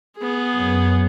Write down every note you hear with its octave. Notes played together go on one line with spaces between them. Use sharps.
B3 G#4
F#2